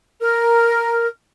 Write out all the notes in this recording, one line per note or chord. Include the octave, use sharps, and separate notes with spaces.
A#4 F6